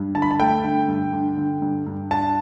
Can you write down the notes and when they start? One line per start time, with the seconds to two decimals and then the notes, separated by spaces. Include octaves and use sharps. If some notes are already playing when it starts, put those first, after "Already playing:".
Already playing: G2
0.15 D3 A5
0.22 B5
0.31 A5
0.39 A3 G5
0.64 D3
0.88 G2
1.13 D3
1.37 D3
1.62 G2
1.86 G2
2.11 D4 A5